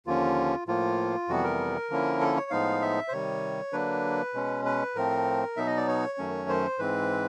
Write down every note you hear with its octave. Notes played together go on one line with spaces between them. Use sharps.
D#2 D3 F3 A#3 C#4 F4
A2 F3 A#3 F4
F2 C3 E3 G3 B3 F#4
A#4
D3 F3 A#3 C#4 E4
A4
C#5
A2 F3 G#3 B3 D#4 F5
E5
C5
C3 D#3 G3 C#5
D3 F#3 A#3 D4 B4
B2 G#3 C#4
B4
A2 F3 A3 C4 A#4
B2 F#3 B3 D#4 E5
D#5
D5
C#5
F#2 D#3 F#3 A3 C#4
C5
G#2 E3 G#3 C4 B4